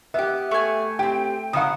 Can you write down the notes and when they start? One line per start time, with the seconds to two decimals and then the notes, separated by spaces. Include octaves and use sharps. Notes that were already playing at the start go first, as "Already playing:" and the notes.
0.14 B3 G4 E5
0.51 A3 G#5
0.99 C4 G4 G5
1.53 C#3 F#3 F5 F#5 D#6